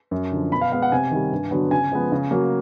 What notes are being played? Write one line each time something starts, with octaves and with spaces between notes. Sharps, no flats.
F#2
D3 F3
B2 B5
F5
G#3 B3 F5
F#5
C3 G#5
D#3 G3
G2
D3 F#3 B3
C#3 G#5
F3 G#3 B3
C#3
F#3 A#3